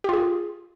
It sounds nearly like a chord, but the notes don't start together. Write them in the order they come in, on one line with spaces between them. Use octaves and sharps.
G4 F4 G#4